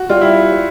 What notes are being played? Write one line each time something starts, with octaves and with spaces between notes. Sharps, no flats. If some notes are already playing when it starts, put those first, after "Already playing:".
Already playing: F#4
G3 F4
E4